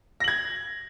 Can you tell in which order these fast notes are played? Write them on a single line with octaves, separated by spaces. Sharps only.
A#6 F#7 G#6